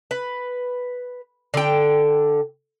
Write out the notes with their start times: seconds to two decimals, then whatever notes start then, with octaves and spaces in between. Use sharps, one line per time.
0.11 B4
1.54 D3 G5